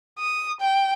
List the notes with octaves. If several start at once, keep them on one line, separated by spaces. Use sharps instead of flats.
D#6
G5